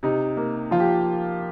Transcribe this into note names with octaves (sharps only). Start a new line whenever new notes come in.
C3 D#4
A#3
F3 F4
G4